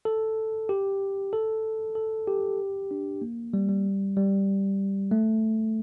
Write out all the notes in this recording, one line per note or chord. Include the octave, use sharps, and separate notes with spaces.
A4
G4
A4
A4
G4
D4
A#3
G3
G3
G3
A3